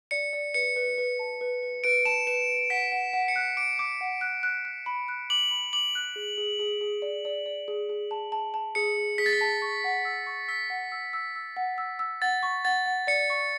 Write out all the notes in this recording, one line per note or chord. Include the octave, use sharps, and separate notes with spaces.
D5 C#7
D5
B4 C#7
B4
B4
A5
B4
B4
B4 D7
A5 E7
B4 E7
B4
F#5 B6
F#5
F#5
C#7
F#6
D6 D7
D6
F#5
F#6
F#6
F#6
B5
F#6
D6 F#7
B5
D6 F#7
F#6
G#4
G#4
G#4
G#4
D5
D5
D5
G#4
G#4
A5
A5
A5
G#4 C#7
G#4
G#4 B6
A6
B6
A5
C#6
F#5
E6
C#6
E6 B6
F#5
E6
E6
E6
F#5
E6
E6
F#5 A6
C#6
F#5 A6
F#5
D5 C#7
C#6